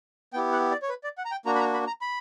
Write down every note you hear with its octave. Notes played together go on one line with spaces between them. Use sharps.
B3 E4 G4 G5
F#5
D5
C#5
B4
D5
F#5
A#5
G5
A#3 D4 F#4 A#5
B5
A#5
B5
A#5
B5